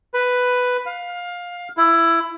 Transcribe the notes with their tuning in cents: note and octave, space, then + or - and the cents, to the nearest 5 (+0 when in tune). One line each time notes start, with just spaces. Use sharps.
B4 +5
F5 +20
E4 +15